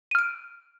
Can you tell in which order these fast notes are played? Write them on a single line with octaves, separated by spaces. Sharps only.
D#7 F6 D7